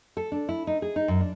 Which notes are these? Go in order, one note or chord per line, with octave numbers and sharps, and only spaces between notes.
A4
D4
E4
D#4
G#4
D#4
F#2
D4